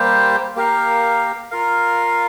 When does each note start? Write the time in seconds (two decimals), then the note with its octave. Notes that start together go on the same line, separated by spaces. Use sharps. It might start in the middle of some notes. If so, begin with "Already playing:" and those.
Already playing: G3 A#3 G4 C5
0.56 A#3 G4 A#4 F5
1.51 F4 A#4 F5